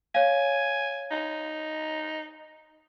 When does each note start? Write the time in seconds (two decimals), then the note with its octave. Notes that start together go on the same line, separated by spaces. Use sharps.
0.14 C#5 F5 G#5
1.11 D#4